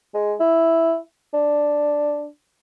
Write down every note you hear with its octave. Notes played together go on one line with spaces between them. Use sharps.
G#3
E4
D4